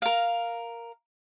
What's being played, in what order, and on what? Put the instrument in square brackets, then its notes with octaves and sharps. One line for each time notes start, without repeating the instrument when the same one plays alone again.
[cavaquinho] A#4 F5